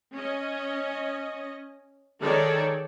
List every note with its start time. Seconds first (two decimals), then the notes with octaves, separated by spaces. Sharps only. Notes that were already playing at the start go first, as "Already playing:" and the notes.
0.17 C#4 D#5
2.22 D#3 G#4 A4 C#5 D5